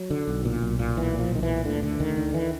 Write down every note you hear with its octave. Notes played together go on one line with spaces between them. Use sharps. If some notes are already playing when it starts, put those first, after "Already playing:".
Already playing: F#3
D3
B1
A#2
B1
A#2
B1 E3
A#2
F3
B1 D#3
E3
A#2
D2 D3
D3
D2 D#3
D3
E3